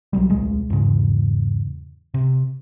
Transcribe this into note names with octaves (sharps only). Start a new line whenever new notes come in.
B1 B2 F#3 G3
D1 B1 G#3
E2 G#2 C#3
C3